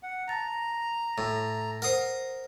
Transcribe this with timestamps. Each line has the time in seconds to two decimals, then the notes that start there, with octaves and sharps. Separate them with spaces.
0.03 F#5
0.28 A5 A#5 A6 A#6
1.18 A2
1.82 A#4 C5 F#5 A#5 D#6